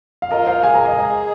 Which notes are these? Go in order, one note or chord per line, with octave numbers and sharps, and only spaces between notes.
F5
F4 A#4 D#5
C5 F5
G#4 G#5
A#5
D#5 G#5
G#4